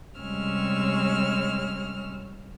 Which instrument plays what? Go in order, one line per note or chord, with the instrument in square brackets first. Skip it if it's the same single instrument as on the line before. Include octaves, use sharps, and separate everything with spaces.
[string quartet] C3 G3 G#3 C#4 E6 F6